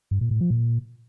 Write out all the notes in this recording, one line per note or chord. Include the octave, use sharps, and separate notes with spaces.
G2
A#2
A2
F3
A#2